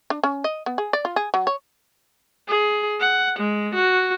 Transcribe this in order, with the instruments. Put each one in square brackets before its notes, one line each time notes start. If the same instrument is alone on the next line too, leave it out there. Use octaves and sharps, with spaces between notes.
[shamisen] D4
C#4
D#5
B3
G#4
D5
F4
G#4
F#3
C#5
[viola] G#4
F#5
G#3
F#4